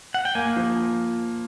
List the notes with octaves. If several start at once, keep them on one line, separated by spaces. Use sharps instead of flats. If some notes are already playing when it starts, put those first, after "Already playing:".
F#5
G5
A#3 G#5
F3